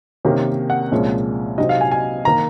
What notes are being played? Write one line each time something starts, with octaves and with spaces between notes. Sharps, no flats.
C3 D#3 A#3 C#4
F#5
C2 A#2 F3 G#3 C#4
C3 F#3 C4 D#4 D#5
F5
G#5
G#5
D#3 A#3 A#5